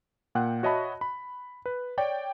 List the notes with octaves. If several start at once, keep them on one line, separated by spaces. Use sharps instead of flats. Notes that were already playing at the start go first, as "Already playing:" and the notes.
A#2 F#5 G5 F#6
F#4 C#5 D#5 E5 A5 B5
B5
B4
C#5 D5 G5